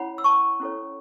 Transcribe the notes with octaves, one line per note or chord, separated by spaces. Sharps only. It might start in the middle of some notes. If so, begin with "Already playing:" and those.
Already playing: C#4 E4 C#5 F#5 B5
E6
A5 C#6
C#4 E4 A4 C#5